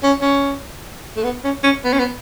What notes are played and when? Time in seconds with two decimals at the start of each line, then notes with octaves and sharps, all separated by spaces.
0.03 C#4
0.22 C#4
1.17 A3
1.23 B3
1.44 C#4
1.63 C#4
1.84 B3
1.93 C#4
1.99 B3